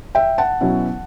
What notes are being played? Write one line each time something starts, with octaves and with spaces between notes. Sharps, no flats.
E5 G5
F#5 A5
B2 F#3 C#4 E4